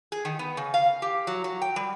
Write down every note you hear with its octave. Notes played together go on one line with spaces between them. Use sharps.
G#4
D#3
B3
C#3
F5
G4
F#3
F#3
G5
G3